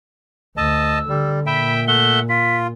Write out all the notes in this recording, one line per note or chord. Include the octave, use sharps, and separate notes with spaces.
D2 D#5 A5 E6
D3 G3
A#2 E5 G5 B5
A3 E5 F#5 G7
F4 B6